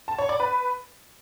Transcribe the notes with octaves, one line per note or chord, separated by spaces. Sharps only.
A5
C#5
D5
B4